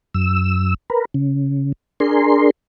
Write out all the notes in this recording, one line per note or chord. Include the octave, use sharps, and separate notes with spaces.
F#2 E6
A#4 B4
C#3
D4 G#4 A#4 C6